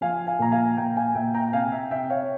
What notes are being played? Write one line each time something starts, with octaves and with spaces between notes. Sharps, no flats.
F3 F5 G#5
F5 G#5
A#2 A#5
F5 G#5
A#2 G5 A#5
F5 G#5
A#2 E5 G5
G5 A#5
G5
C3 F5 G#5
E5 G5
C3 E5 G5
C#5 F5